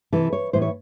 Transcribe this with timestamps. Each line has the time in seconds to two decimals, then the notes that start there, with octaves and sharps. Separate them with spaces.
0.13 C3 E3 A4
0.33 C#5
0.53 A2 E3 C5
0.62 C#5